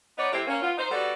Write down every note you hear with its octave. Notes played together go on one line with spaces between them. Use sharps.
B3 D#4 C#5 D5
C3 A3 C4 E4 G4
A#3 C#4
B3 F4
D#4 C5
G3 B3 F#4 A4 D5